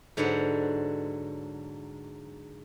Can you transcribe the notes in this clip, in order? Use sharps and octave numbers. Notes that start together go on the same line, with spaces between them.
G#2 D3 F#3 B4 C5 F#5